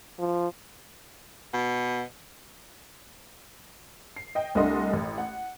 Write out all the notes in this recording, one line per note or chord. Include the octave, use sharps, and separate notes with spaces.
F3
B2
C7
D#5 G5
C2 A3 D4 D#5 F#5 C6
A1
F#5